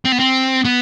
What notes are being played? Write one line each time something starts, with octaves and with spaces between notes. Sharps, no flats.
C4
B3
C4
B3